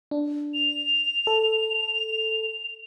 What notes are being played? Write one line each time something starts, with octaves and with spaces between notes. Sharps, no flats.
D4
F7
A4